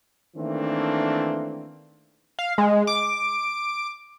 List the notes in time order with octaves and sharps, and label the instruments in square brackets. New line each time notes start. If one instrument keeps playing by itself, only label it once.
[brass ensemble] D#3 E3 A3 A#3 C4 D4
[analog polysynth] F5
G#3
D6